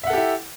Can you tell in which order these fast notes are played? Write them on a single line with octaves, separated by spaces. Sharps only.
E5 F#5 A4 G4 E4